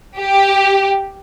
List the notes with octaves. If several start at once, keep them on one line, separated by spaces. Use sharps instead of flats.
G4